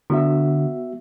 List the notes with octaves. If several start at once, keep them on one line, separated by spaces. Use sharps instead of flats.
D3 B3 F#4 E5